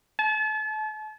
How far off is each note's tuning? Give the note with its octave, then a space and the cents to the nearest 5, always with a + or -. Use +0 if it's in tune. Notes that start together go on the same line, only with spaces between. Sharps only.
A5 -35